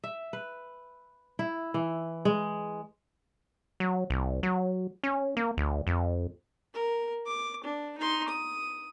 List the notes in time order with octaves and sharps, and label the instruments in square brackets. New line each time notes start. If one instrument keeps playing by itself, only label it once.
[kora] E5
B4
E4
E3
G#3
[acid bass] F#3
C2
F#3
C#4
A#3
D2
F2
[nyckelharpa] A#4
D6
D4
D#4 C6
D#6